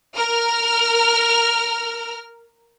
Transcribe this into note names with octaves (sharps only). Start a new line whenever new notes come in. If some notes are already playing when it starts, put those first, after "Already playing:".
A#4 F6